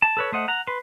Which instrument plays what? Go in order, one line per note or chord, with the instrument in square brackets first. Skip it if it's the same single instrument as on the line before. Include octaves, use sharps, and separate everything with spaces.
[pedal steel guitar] A5
A4 B4 C#5
A3 C5 D#5 F#5
F#5 A#5
B4 C6